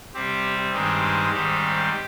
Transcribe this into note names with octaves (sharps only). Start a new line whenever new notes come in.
C3 G3 C4 G4
G2 D#3 G#3 C4 G4
G#2 D#3 G3 C4